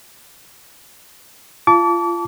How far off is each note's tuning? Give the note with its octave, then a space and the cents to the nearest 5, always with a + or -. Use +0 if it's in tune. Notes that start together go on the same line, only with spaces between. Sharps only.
F4 -25 A5 +0 D6 -35